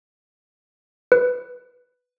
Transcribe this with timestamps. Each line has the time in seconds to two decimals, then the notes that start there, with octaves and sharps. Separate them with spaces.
1.12 B4